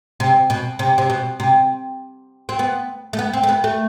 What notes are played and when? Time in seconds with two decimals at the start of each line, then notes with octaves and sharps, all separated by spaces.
0.20 C3
0.50 B2
0.79 C3
0.98 C3
1.10 B2
1.40 C3
2.49 C4
2.59 B3
3.13 A3
3.19 B3
3.33 C4
3.43 A3
3.49 B3
3.64 A3